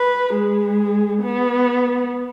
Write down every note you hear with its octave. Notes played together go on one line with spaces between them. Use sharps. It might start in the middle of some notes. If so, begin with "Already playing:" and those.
Already playing: B4
G#3
B3